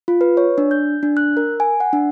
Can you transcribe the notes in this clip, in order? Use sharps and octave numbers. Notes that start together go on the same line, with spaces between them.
F4
B4
C#5
D4
G6
D4
F#6
A#4
G#5
F#5
D4